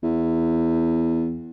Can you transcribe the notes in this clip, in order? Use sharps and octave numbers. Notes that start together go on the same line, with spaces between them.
E2